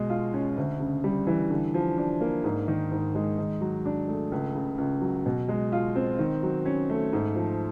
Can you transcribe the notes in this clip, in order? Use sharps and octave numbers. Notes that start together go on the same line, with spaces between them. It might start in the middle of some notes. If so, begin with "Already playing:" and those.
Already playing: B2 G#3
F4
C#4
D2
C#3
G3
E3
D3
F3
D4
A#3
G#2
D#3
G#2
G#3
D#3
F#3
D4
A3
C#2
C#3
C#2
F#3
B2
G#3
F4
C4
D#3
F#3
C#4
A3
G#2
F3